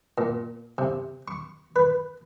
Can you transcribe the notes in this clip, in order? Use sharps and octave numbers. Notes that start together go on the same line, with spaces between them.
A#2
C3
C#6
B4